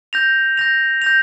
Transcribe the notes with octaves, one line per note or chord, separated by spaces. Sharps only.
G6 A#6 F7
G6 A#6 F7
G6 A#6 F7